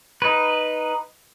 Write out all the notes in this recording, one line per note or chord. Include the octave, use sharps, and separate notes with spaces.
D#4 B4